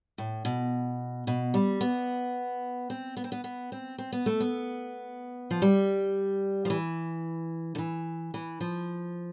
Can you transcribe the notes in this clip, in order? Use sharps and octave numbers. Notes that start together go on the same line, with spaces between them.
A2
B2
B2
G3
B3
C4
B3
C4
B3
B3
C4
C4
B3
A3
B3
F3
G3
F3
E3
D3
E3
E3
F3